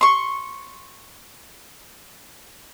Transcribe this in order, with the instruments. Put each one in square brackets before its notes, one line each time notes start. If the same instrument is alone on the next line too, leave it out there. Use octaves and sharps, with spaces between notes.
[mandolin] C6 C#6